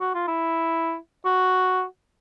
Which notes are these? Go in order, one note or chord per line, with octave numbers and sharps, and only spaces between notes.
F#4
F4
E4
F#4